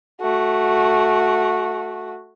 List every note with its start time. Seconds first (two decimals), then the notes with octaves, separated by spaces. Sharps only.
0.21 A3 F#4